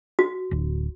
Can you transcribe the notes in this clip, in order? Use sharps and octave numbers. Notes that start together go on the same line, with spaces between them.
F#4
D1